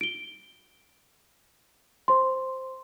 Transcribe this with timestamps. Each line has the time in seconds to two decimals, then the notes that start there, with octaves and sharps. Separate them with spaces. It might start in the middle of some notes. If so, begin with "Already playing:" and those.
0.01 D7 G7
2.08 C5 C6